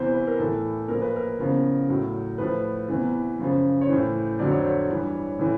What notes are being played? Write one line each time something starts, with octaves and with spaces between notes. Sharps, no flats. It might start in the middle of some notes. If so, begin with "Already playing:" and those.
Already playing: E2 C3 E3 C5
B4
A#4
A2 E3 A4
A#2 F3 A#4
B4
A#4
E2 C#3 F3
A2 F#3
A2 F3 B4
E2 C3 E3
F#2 C#3 F3
C#5
A2 E3 C5
F2 D3 F#3 D5
C#5
C5
C#5
G2 E3
A2 E3